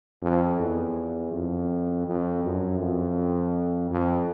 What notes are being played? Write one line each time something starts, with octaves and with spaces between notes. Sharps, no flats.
F2
E2
F2
F2
F#2
F2
F2